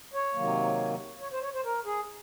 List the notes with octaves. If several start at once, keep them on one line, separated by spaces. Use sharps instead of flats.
C#5
C3 D#3 F#3 A#3
C#5
C5
C#5
C5
A#4
G#4